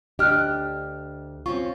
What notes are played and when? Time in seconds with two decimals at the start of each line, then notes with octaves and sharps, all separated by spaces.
0.19 D2 D4 G4 D#5 F6 F#6
1.46 C4 C#4 F4 C#6